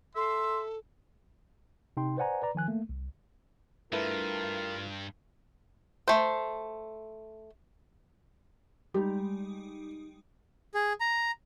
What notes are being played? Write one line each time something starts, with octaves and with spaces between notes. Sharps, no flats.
A4 E5 C6
C3 D#4 G5 C6
B4 C5 D5 F#5 G#5 A#5
B4 D5 A#5
D#3 F3 G#5 F#6
A3 A#3
C2
G2 A3 E4 F4 A#4 B4
A3 C5
G3 G#3 D#4 G4
G#4
A#5